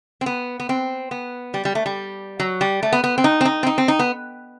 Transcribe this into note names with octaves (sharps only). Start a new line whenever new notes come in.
C4
B3
B3
C4
B3
G3
G3
A3
G3
F#3
G3
A3
B3
B3
C4
D#4
C4
D#4
C4
D#4
C4
D#4
B3